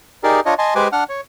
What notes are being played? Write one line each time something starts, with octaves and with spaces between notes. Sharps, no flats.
D#4 G4 G#4 A#4 D5
D4 F4 C#5 D#5
D#5 G#5 A5 C6
G#3 G4 B4 C5 G#5 D6
D4 F#5 F6
C#5